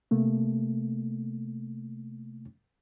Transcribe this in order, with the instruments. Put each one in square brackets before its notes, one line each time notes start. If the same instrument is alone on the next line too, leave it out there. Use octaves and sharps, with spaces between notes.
[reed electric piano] C3 A3 A#3